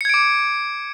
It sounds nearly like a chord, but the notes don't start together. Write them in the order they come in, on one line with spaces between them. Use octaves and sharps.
C#7 G#6 D7 D6